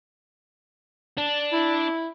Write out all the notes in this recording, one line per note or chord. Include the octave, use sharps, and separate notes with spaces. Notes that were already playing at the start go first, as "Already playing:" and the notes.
D4
E4